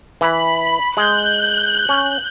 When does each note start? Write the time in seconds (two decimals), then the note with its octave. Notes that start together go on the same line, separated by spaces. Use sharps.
0.21 E3 B5
0.97 G#3 F#6 G6
1.89 C#4